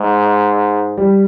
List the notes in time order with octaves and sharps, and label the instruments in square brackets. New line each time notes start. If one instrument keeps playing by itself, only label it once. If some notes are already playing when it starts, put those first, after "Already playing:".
Already playing: [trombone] G#2 [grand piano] G#3
[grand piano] G3